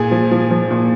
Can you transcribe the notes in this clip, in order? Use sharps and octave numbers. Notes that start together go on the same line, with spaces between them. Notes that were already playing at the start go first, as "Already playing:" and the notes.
Already playing: A#2 G#4
F3
F3
F3
A#2